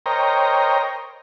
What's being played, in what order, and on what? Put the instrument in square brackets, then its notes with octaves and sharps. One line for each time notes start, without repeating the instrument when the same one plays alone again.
[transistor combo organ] A#4 C5 C#5 D#5 G5 A#5